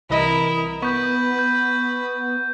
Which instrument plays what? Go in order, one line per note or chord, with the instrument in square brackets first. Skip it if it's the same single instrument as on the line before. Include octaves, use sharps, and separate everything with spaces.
[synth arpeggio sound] C2 E3 D#5 [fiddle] E4 A#4
[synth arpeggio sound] B3 [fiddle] B4 [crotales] C#6 G6
[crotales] G6